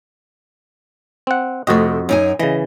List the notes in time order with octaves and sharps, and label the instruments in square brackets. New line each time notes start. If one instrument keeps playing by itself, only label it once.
[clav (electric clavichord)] C4 F#5
[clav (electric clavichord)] F2 F#4 D#5 [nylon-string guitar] C3 A3
[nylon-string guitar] F#2 D#4 G#5
[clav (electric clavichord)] C#3 E3 [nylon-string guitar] D#5